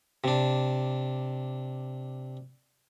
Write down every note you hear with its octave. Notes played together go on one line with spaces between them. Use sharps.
C3 D4